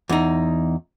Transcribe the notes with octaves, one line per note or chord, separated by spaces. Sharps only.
E2 D#4